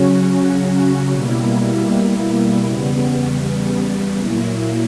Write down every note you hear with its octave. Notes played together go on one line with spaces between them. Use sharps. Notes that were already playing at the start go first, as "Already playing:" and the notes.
Already playing: C#3 F#3 C#4 F#4
B2 G3 A#3 E4
E2 C#3 G3 B3
A#2 F#3 A#3 E4